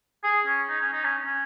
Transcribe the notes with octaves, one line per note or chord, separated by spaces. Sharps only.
G#4
C#4
D#4
C#4
D#4
C#4
C#4